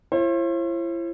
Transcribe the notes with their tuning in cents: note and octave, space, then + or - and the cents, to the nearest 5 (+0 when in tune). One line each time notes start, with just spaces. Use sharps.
E4 +40 C5 +45